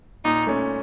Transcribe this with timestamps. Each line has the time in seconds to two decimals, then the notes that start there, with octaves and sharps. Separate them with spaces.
0.24 A#2 D#4
0.47 A3 C#4